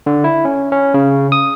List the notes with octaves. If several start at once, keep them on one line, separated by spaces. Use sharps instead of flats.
D3
E4
C#4
C#4
C#3
D#6